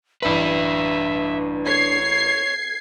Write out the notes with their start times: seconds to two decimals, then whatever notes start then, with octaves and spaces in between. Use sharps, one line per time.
0.22 A1 D4 B4 E5 B5
1.66 C#5 G#6 C7